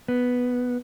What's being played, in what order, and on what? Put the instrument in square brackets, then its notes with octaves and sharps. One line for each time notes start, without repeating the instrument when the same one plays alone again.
[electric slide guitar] B3